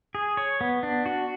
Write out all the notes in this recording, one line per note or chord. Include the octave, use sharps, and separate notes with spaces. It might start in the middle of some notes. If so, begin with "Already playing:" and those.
G#4
C#5
B3
D4
F#4